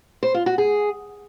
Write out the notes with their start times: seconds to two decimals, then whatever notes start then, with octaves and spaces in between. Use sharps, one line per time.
0.23 C5
0.34 F4
0.46 F#4
0.58 G#4